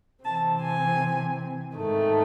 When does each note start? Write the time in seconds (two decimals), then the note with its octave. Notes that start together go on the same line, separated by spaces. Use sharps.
0.25 C3 E3 C4 A5
0.62 G#5
1.75 G#2 D#3 A3